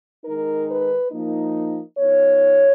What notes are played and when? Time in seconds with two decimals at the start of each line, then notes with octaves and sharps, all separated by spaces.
0.24 D#3 G#3 D#4 A#4
0.68 B4
1.11 F3 A#3 D#4
1.98 F3 B3 D#4 C#5